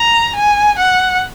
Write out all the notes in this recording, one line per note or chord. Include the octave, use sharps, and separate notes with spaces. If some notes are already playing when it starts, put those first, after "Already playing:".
Already playing: A#5
G#5
F#5